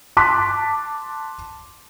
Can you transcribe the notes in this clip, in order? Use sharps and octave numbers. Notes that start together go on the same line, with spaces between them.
A5 C6 D6 F#6 B6